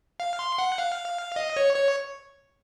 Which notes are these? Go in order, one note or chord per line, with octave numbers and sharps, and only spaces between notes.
F5
C6
F#5
F5
D#5
C#5
C#5